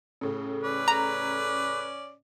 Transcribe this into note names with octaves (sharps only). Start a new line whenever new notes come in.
A2 C#3
C#4 B4 D5
A#5